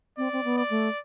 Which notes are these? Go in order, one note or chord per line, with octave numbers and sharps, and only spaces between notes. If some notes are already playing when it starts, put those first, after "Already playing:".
C4 D5
C4
B3
D5
A3